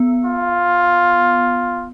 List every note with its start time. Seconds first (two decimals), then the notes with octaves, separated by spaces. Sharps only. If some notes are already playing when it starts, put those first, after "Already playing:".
Already playing: B3
0.25 F4